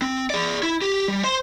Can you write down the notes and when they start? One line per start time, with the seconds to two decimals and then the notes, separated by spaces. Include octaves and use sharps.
0.02 C4
0.30 G#4 D5
0.63 E4
0.82 G4
1.08 G3
1.24 C5 C6